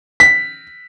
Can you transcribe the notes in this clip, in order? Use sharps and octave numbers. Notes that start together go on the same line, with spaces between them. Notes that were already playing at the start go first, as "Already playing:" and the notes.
B6